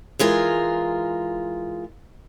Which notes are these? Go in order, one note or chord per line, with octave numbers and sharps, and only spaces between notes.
E3 G#3 F4 A#4